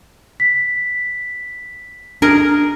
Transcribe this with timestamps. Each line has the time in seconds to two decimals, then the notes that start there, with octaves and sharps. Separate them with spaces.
0.40 B6
2.22 D4 G#4 A#4 D#5